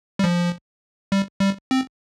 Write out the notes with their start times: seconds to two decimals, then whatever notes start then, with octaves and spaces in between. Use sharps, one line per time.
0.19 G3
0.24 F3
1.12 G3
1.41 G3
1.71 C4